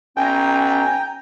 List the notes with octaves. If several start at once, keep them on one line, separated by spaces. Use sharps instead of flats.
B1 C#4 G5 G#5 A#5